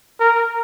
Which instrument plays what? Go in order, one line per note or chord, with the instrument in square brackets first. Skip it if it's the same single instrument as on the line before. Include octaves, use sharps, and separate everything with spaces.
[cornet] A#4